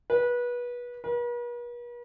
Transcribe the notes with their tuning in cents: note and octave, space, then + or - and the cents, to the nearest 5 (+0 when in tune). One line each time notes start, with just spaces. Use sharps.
B4 -25
B4 -45